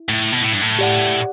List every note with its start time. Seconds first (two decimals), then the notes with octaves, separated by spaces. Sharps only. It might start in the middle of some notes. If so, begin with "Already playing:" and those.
Already playing: E4
0.09 A2
0.32 B2
0.42 A2
0.53 G2
0.62 A2
0.79 G4 D5 F#5